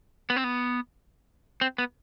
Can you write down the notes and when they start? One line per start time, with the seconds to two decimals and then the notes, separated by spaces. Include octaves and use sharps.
0.30 B3
0.36 C4
0.44 B3
1.61 C4
1.78 B3